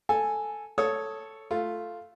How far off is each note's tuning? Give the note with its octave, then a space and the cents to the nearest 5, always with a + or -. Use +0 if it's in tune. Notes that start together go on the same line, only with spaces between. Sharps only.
A4 +0 G#5 +0
A4 +0 C#5 +0 D#6 +15
A3 +0 F4 +0